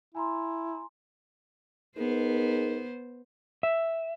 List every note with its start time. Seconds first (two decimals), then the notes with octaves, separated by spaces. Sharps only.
0.15 E4 G#5 A#5 C6
1.98 B3 D#4 G#4 A#4 C5
3.63 E5